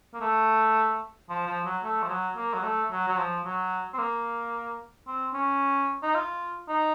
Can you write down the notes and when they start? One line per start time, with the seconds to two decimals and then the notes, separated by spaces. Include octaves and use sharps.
0.14 A#3
0.21 A3
1.29 F3
1.47 F3
1.65 F#3
1.83 A3
2.02 F3
2.09 F#3
2.37 A#3
2.54 F#3
2.63 A3
2.92 F#3
3.08 F#3
3.17 F3
3.45 F#3
3.94 C4
3.98 A#3
5.07 C4
5.34 C#4
6.03 D#4
6.15 F4
6.68 D#4